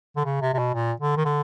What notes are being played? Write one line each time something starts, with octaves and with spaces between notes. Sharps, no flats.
D3
C#3
C3
C3
B2
A#2
D3
D#3
D3